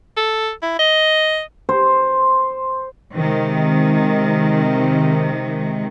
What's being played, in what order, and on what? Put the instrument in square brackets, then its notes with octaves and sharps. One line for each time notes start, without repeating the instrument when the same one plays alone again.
[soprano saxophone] A4
E4
D#5
[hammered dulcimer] C5
[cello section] C3 D#3 G#3